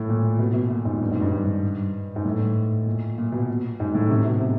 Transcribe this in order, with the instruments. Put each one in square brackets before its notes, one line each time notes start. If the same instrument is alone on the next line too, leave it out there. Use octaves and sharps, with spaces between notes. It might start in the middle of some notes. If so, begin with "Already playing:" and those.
Already playing: [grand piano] A2
A#2
B2
B2
A#2
G#2
G2
G#2
G2
G#2
G#2
A2
A#2
A#2
B2
G#2
A2
C3
B2
C3